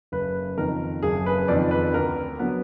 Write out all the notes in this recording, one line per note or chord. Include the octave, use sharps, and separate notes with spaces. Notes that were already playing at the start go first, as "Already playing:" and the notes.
F#1 B4
F2 D#3 A#4
F#1 G#4
B4
F2 D#3 D5
B4
D2 A#4
D3 F#3 B3